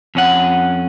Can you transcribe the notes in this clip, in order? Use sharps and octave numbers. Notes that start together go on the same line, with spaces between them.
F2 C#4 F#5